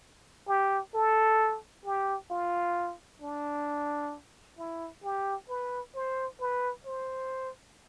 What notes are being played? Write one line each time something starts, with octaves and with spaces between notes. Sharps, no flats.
G4
A4
G4
F4
D4
E4
G4
B4
C5
B4
C5